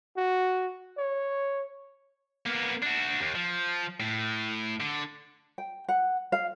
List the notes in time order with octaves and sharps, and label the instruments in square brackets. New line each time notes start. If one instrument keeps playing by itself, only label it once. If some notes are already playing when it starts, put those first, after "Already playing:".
[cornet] F#4
C#5
[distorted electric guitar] A#3 B3
D4 F#4
D#2
F3
A2
D3
[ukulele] G5
F#5
F5